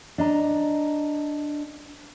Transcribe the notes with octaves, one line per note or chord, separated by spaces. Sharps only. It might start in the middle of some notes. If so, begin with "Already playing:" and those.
D4 D#5 A#5